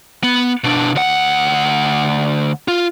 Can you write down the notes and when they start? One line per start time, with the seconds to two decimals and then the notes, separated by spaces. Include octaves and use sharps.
0.24 B3
0.64 B2 D4
0.95 D2 F#5
2.68 F4